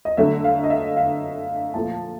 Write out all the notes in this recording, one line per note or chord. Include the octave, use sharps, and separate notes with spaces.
D#5
D3 F#3 A3 E5
F5
D#5
E5
F5
A#2 F3 A3 A5